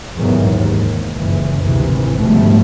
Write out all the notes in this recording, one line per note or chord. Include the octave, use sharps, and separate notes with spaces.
E2 G#2 C3 D#3 E3 F#3
D#2 G#2
F#1 C#2 E3
G#1 D2 C3 D#3 E3
G#2 B2 D3 F3 G3 A3